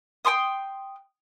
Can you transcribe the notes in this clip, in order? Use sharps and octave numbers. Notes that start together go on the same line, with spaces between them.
G5 G#5 C6 D#6